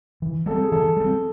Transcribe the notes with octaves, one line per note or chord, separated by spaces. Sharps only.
E3
G3 C4 A4
G#4
E3 A4
G3 C4